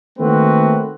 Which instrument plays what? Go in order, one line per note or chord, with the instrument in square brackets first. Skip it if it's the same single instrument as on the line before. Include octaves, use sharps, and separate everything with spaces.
[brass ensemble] D#3 A3 A#3 C4 F#4 B4